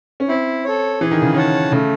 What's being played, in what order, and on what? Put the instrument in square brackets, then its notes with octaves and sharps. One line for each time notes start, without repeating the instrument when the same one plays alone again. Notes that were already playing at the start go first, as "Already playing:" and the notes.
[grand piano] C#4
[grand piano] C4 [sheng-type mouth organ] E4
[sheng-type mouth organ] A4 C#5
[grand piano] E3 [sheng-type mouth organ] G#4
[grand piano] D#3
C#3
[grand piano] D#3 [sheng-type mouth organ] C#5 F#5 A5
[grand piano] C#3 [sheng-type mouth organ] A3